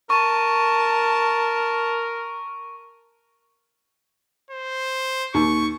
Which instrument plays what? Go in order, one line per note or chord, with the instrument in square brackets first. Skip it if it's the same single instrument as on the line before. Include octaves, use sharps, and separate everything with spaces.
[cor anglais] A#4 [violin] A5 [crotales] C#6
[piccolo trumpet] C5
[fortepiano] D#2 [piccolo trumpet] C#6